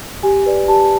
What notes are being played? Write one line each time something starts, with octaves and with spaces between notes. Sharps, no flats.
G4 G#5
B4 D5
G4 A5